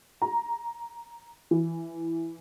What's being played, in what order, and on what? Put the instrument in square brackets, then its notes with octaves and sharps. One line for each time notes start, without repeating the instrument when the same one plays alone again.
[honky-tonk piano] A#5
E3